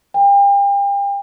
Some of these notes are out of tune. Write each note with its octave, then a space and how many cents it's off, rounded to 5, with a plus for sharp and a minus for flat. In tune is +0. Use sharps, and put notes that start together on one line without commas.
G5 +35